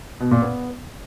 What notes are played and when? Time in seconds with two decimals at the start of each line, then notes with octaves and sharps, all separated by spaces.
0.20 B2
0.31 A#2
0.42 B3